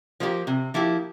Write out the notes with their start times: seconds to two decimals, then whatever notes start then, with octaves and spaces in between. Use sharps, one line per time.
0.20 F3 A#3 E4 G4
0.47 C3
0.74 F3 A#3 E4 G4